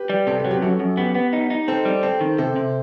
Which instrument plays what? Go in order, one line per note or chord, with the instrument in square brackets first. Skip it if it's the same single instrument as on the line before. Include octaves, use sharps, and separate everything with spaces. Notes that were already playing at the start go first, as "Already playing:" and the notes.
Already playing: [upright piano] G4 B4
[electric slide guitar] G3
[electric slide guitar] C3 [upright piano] A4 C5
[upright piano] G4 B4
[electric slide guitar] F#3
[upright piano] G4 B4
[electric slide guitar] F#2 [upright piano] F#4 A4
[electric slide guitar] F#2
[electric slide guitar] B3 [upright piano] G4 B4
[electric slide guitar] B3
D#4
D#4
[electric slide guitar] C4 [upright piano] A4 C5
[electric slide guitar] G3
[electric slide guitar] C4 [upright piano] A4 C5
[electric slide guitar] D#3
[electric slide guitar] C3 [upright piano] A4 C5
[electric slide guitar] C3